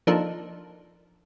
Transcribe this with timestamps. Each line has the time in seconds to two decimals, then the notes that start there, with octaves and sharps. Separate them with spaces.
0.07 F3 A#3 D4 D#4 A4